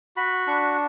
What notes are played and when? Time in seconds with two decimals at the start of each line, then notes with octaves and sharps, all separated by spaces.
0.16 F#4 B5
0.47 D4 C#6